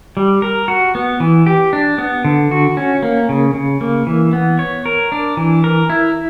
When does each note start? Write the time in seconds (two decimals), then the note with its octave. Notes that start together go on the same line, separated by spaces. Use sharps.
0.17 G3
0.42 A#4
0.68 F#4
0.95 B3
1.20 E3
1.46 G4
1.73 D4
1.98 B3
2.25 D3
2.51 F#4
2.77 C#4
3.03 A#3
3.29 C#3
3.54 C#3
3.81 A#3
4.07 E3
4.33 B3
4.59 C#5
4.86 A#4
5.12 D4
5.37 E3
5.64 A#4
5.90 E4